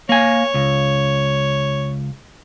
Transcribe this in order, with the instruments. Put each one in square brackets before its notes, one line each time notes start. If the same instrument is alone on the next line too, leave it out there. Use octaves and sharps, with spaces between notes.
[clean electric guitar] A#3 G#5 [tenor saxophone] C#5
[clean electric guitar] C#2